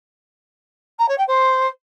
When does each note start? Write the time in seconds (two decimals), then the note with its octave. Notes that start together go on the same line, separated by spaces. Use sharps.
0.99 A#5
1.08 C#5
1.18 G5
1.27 C5